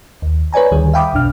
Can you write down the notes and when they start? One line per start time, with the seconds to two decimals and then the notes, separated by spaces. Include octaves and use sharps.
0.22 D#2
0.53 B4 C#5 D5 G#5 A#5
0.71 D2 D#3 G3 G#4
0.93 E5 F5 G5 B5 D6 D#6
1.13 B1 F2 B2 D4 F6